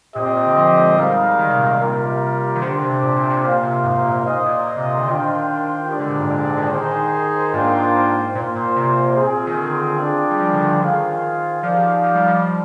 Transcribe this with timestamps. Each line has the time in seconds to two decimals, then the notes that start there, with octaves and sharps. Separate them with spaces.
0.15 A#2 C4 G4 C5 D#5
0.26 A#2
0.36 A#2
0.46 D3
0.56 F3
0.77 G#3
0.98 G3 G#3 D#4 A#4 F5
1.39 D#3
1.49 C3
1.59 A#2
1.70 A#2
1.79 C3 G3 A#3 F4 A#4
2.55 D#3
2.61 D3 D4 G4 C5
2.82 C3
3.02 A#2
3.16 A#2
3.30 C3
3.43 A#2 A#3 F4 C5 F5
3.63 C3
3.84 G#2
3.96 G#2
4.04 A#2
4.25 G#2 A#3 F4 C5 D#5
4.46 A#2
4.66 A#2
4.76 C3
4.86 A#2
4.97 D3
5.07 D#3 D4 F4 C5 G5
5.88 D#3 G#3 D4 G4
5.99 D3
6.09 A#2
6.20 G#2
6.30 A#2
6.44 D3
6.58 D#3
6.71 D#4 G#4 C5
7.52 G#2 A#3 D4 F4 C5 G5
7.75 G#2
8.35 A#2 A#3 F4 C5
8.55 A#2
8.76 C3
9.16 C4 F4 G#4
9.47 D#3
9.58 D3
9.98 D4 F4 G#4 D5 G5
10.30 G3
10.40 F3
10.53 D3
10.59 D#3
10.80 D#3 F4 G#4 C5 F5
11.62 F3 D#4 G4 D5 F5
12.04 F3
12.15 G3
12.27 F3